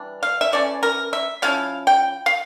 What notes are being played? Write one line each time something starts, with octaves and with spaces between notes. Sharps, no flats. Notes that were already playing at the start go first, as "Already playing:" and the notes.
Already playing: E3 G3 D4
F5
E5
E3 A3 C#4 D5
A#4
E5
F3 C#4 E4 F5
G5
F5